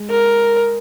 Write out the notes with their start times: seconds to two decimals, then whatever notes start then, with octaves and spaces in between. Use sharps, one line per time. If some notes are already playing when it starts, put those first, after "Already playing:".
Already playing: G#3
0.10 A#4